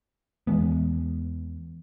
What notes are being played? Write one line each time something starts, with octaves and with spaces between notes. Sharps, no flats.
E2 E3 G#3 B3